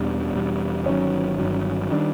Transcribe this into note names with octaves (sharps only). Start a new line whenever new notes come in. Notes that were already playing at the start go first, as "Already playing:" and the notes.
Already playing: E2 B2 G3 D4
E2 B2 G3
G1 G2 D#3 F#3 C#4
G1 G2 D#3 F#3
D#3 G3 D4